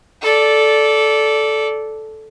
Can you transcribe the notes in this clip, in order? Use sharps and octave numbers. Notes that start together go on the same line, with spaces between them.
A4 D5